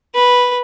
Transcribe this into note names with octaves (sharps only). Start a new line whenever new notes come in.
B4